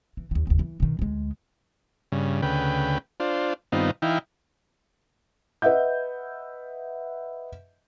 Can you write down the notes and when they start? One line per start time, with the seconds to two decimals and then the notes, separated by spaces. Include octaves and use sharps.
0.17 E3
0.31 D#2 D#3
0.47 F#1 D#2
0.59 E3
0.80 B2 D#3
0.99 D2 G#3
2.12 G2 C#3
2.42 D2 C#3 B4 G5
3.20 D4 F4 C5
3.72 G2 D#3 B3 C4 D#4 F4
4.02 E3 D#4 E4 F5 G5
5.62 B4 D#5 E5 F#5 G6